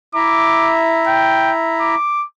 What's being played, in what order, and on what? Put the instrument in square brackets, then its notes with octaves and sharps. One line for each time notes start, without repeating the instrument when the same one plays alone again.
[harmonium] E4 E5 A#5 [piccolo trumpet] D6
[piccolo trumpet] G5
D6